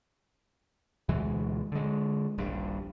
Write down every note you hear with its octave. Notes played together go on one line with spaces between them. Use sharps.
D2 B2 E3 G#3
D3 G#3
D#1 A#1 G2